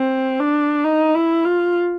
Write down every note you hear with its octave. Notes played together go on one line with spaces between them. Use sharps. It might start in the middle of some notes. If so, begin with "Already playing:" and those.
Already playing: C4
D4
D#4
E4
F4